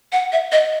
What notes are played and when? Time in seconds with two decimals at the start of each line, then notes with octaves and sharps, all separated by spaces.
0.12 F#5
0.32 E5
0.52 D#5